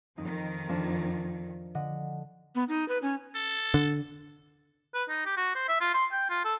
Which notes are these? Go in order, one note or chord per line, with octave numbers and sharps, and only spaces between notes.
F2 D#3 D#4
F3 D4 A5
D3 D#5 F#5
B3
D#4
B4
C#4
A4
D3
B4
D#4
G4
F#4
C5
E5
F4
C6
G5
F4
A4